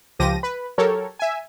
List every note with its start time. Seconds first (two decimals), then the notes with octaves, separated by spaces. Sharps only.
0.19 C#2 F3 G4 A#6 D#7
0.43 B4
0.78 F#3 G4 A4 A#4 C#5
1.19 E5 G#5